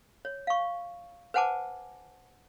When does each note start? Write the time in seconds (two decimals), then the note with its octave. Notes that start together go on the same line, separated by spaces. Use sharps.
0.25 C#5
0.47 F5 C#6
1.34 B4 C5 F#5 G#5 A5 D6